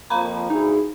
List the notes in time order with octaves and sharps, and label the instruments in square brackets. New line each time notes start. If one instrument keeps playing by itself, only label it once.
[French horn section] F2 F3 A#3 [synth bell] F5 A#5 B5
[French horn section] D2 E4 G#4 [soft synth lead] D#4